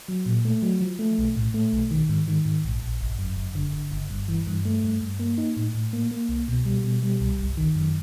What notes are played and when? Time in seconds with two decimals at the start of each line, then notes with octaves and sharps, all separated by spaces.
0.08 F#3
0.26 A#2
0.45 A3
0.62 F#3
0.81 F3
0.99 A3
1.18 B1
1.36 A2
1.54 A3
1.73 B1
1.91 D#3
2.09 G#2
2.28 D#3
2.45 G#2
2.64 A#1
2.83 A#1
3.01 G1
3.19 F#2
3.37 G1
3.55 D3
3.73 G1
3.92 G1
4.10 G2
4.28 E3
4.47 G2
4.65 A3
4.84 G2
5.01 G2
5.19 A#3
5.38 D#4
5.57 A2
5.75 A2
5.93 A#3
6.11 A#3
6.29 C2
6.48 B2
6.65 G3
6.84 B2
7.03 G3
7.21 C2
7.39 G1
7.57 D#3
7.75 F#2